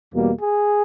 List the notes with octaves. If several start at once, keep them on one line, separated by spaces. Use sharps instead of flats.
E2 B2 G3 A#3
G#4